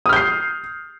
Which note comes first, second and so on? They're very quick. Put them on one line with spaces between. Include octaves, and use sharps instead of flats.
D#6 F6 G6 C7